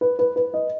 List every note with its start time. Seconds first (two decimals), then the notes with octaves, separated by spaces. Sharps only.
0.01 B4
0.19 B4
0.36 B4
0.54 D#5